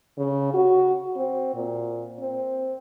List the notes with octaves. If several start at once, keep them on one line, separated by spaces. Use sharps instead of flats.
C#3
F#4
C4
A#2
C4